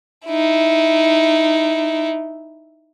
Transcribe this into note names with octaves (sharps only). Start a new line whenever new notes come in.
D#4 E4